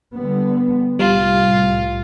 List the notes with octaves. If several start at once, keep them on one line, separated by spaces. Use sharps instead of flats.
D3 G3 B3
C2 A2 G3 F4